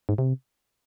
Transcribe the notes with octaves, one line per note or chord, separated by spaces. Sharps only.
G#2
C3